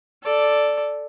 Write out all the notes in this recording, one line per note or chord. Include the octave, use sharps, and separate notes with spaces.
A4 D5